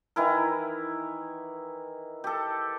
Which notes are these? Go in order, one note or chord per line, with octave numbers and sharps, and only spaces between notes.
D#3 E3 E4 A#4
G4 A4